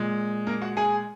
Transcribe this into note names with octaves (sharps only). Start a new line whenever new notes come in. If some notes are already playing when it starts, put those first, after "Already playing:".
Already playing: A#2 G#3
A#3 A#4
F#4 F#5
G#4 G#5